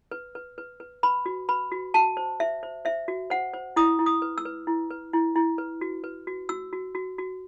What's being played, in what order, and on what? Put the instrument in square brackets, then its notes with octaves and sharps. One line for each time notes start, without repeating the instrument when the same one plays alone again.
[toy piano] B4
B4
B4
B4
B4 B5
F#4
B4 B5
F#4
F#4 A5
C5
C5 E5
C5
C5 E5
F#4
C5 F#5
C5
E4 D#6
E4
D#6
B4
E6
B4
E4
B4
E4
E4
B4
F#4
B4
F#4
F#4 E6
F#4
F#4
F#4